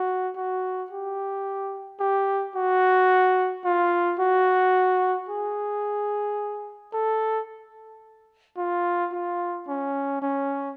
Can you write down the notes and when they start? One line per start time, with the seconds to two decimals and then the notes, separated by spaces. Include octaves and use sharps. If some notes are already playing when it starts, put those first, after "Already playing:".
Already playing: F#4
0.36 F#4
0.90 G4
2.00 G4
2.55 F#4
3.65 F4
4.19 F#4
5.29 G#4
6.93 A4
8.57 F4
9.12 F4
9.67 C#4
10.22 C#4